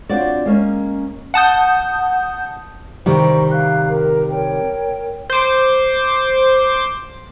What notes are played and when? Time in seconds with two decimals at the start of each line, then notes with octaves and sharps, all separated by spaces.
0.09 C4 D4 F4 F#4 C#5 D5
0.46 G#3 A#3 C#4
1.34 F#5 A5 D#6 G6
3.06 C3 D#3 G3 C5 A#5 C#6
3.52 F5 F#6
3.88 A#4
4.30 A#4 C#5 G5
5.30 C5 D6